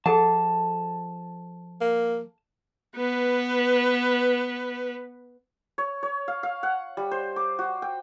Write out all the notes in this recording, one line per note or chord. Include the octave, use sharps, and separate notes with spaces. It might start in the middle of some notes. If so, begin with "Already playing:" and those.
F3 G#4 A4 F#5 A5
A#3
B3 B4
C#5
C#5
F5
F5
F#5
G3
C5
D6
F#4
G5